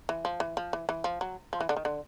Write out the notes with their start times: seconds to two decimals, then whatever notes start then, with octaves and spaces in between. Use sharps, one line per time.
0.09 E3
0.25 F3
0.40 E3
0.57 F3
0.73 E3
0.89 E3
1.04 F3
1.21 F#3
1.53 F3
1.61 E3
1.69 D3
1.76 D#3
1.85 D3